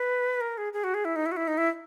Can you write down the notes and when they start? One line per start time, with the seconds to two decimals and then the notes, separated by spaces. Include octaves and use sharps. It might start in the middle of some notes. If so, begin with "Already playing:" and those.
Already playing: B4
0.41 A#4
0.58 G#4
0.73 G#4
0.84 F#4
0.94 G#4
1.05 E4
1.16 D#4
1.26 E4
1.32 F#4
1.36 E4
1.48 D#4
1.57 E4